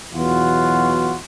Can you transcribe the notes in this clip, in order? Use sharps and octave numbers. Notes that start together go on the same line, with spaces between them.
E2 B2 F#3 F4 F#4